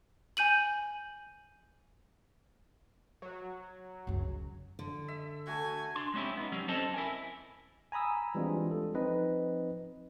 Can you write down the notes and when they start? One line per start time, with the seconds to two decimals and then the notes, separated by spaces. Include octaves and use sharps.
0.37 G#5 G6 D#7 F#7
3.22 F#3
4.07 C#2 F#2
4.79 D3
5.08 E5
5.47 A3 F#4 G#5
5.95 D4 C6
6.14 G#3 C4 C#4 E4 G4
6.37 B3 D#4
6.52 F#3 G3 C#4 G4
6.68 C4 C#4 A4 C5 D#5 A5
6.94 E4 A#4 G#5
7.92 G#5 A#5 B5 D#6 E6
8.35 E3 G3 G#3 C4 D4 F4
8.71 A4
8.94 F3 C4 D#4 B4 D#5